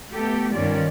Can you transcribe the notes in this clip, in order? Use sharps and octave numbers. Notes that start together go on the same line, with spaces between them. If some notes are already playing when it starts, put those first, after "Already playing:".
A3 B3 G4 A4
G2 D#3 C#4 F4 D5